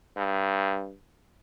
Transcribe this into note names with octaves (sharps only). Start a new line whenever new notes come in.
G2